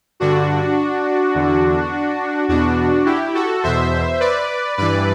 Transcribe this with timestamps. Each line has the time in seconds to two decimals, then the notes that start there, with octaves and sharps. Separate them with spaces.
0.20 G2 D3 D4 F#4
1.35 E2 D3
2.48 E2 B2 D4 F#4
3.06 E4 G4
3.35 F#4 A4
3.63 E2 B2 C5 E5
4.20 B4 D5
4.77 G2 E3 B4 D5